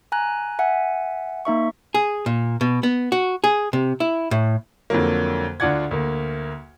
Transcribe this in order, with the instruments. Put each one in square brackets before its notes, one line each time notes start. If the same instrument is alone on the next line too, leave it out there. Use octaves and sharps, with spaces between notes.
[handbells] G#5 A#5 F#6
E5 F#5 G#5
A#3 D#4 E5 C#6
[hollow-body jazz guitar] G#4
A#2
B2
B3
F#4
G#4
C3
E4
A2
[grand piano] F2 D3 F#3 A#3
D2 D4 F4 D5 F#5 G#6
D2 A#3